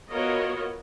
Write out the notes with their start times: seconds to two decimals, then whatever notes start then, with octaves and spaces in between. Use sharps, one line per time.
0.11 B3 F4 F#4 A#4 C#5 D#5